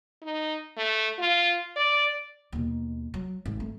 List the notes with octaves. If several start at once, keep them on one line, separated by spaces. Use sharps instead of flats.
D#4
A3
F4
D5
D#2 B2
F#3
G#1
A3